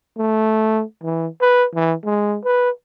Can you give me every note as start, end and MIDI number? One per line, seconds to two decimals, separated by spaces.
0.18 0.83 57
1.03 1.27 52
1.41 1.66 71
1.74 1.94 52
2.05 2.38 56
2.45 2.70 71